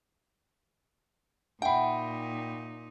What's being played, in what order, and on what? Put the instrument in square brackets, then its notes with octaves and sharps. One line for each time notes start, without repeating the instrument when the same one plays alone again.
[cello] A#2 D#4 [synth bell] E5 F#5 [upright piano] G5 B5